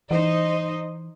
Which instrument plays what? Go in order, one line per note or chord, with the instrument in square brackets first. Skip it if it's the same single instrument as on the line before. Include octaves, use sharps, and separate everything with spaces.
[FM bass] E3 [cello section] D#4 C5 D#5